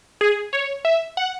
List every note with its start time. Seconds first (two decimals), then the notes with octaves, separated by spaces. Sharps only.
0.21 G#4
0.53 C#5
0.85 E5
1.17 F#5